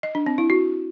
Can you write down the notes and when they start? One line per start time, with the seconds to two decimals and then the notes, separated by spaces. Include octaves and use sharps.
0.03 D#5
0.15 D4
0.26 C4
0.38 E4
0.50 F#4